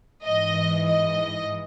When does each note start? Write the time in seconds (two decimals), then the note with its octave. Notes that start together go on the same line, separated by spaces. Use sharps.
0.23 G#2 E3 D#5
0.87 D#5